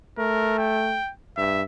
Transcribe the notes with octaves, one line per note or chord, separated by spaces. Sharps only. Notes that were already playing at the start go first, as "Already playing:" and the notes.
A3 A#4
G5
G2 E5